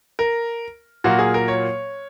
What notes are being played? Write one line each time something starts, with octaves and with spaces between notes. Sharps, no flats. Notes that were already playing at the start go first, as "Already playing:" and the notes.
A#4
A#2 F#3 A#3 F#4
G#4
A#4
C#5